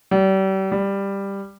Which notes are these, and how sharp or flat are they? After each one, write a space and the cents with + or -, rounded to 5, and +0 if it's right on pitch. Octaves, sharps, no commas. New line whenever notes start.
G3 -35
G3 +10